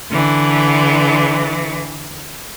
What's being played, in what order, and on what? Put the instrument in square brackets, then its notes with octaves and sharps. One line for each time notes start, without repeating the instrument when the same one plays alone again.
[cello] D3 E3